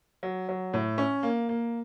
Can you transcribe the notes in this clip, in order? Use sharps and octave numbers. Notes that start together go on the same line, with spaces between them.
F#3
F#3
A2
C#4
A#3
A#3